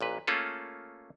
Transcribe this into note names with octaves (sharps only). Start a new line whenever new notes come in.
A1 A#2 B4
A3 A#3 C#4 F4 G#4 A4